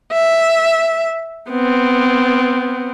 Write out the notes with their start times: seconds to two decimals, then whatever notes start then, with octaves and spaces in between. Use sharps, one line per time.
0.12 E5
1.50 B3 C4